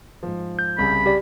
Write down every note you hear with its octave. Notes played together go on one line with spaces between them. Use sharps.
G#2 F3
G6
C2 C#3 B5
G4 D5